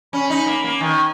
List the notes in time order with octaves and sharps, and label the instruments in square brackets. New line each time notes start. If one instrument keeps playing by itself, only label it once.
[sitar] C#4 [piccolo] B5
[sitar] D#4
A#3
A#3
[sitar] D#3 [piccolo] G#5